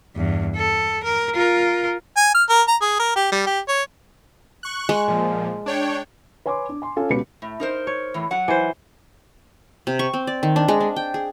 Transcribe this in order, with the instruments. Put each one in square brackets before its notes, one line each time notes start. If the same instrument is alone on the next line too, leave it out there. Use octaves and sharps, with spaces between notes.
[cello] E2 G2
A4
A#4
F4 A#4
[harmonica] G#5
F6
A#4
A#5
G#4
A#4
G4
G3
G4
C#5
[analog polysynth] C#6 F#6
[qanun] G#3
[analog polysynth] A#2 F3
D4 C#5 G5
[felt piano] B4 C#5 G#5 C6 D6
D4
G#5 C6
C#4 F4 A4 F5 G#5
C#2 B2 G4 B4 C#7
[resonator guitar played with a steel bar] A2
D#4 A#4 C5
[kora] C#5
[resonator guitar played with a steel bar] A2 E3
F#3 F#5
[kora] E3 C5
[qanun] C3
C#6
C4
D5
D#3
D4
G#3
D4
G5
G#4